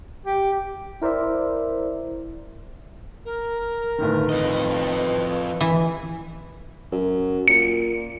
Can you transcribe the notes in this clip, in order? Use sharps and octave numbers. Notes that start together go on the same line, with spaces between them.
G4
E4 A#4 C5 D5 E5
A#4
G1 A2 D#3
F2 B4 D#5
E3 E5
F#2
A#2 C#7